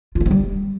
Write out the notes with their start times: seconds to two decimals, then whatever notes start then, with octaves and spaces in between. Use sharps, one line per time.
0.15 F4
0.20 A#3
0.26 C4
0.31 G3